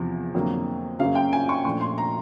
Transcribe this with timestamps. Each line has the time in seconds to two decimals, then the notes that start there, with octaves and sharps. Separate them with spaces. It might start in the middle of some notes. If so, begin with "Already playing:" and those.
Already playing: E2 C3 F3
0.34 F2 D3 F#3 A#3
0.99 F#2 C#3 F#3 A#3 C#4 F5
1.15 G5
1.33 G#5
1.49 C#6
1.65 A#2 F3 A3 D4 C#6
1.81 C6
1.98 A#5